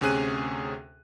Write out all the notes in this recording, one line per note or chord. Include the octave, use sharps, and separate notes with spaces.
D2 C3 C#4 G#4 F#6 D#7